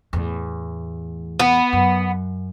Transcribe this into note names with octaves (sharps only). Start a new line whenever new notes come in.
E2 A2
B3
F#2